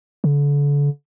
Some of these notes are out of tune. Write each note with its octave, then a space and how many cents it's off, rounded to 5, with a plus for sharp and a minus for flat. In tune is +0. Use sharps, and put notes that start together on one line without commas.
D3 -35